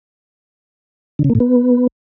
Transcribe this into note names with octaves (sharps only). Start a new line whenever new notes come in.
D3
C#3
A#3
A2
B3